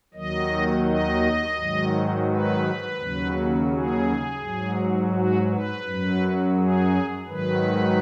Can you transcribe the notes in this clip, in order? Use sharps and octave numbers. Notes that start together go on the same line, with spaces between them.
D#2 D#3 F#3 D#5
D#5
G#2 D#3 F#3
B4
D#2 C#3 F#3
G#4
G#2 F#3
F#4
B4
F#2 F#3
G#4
G#2 D#3 F#3 B4